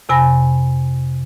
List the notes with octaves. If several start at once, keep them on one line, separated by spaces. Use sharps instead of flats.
F2 C3 G#5 B5 A#6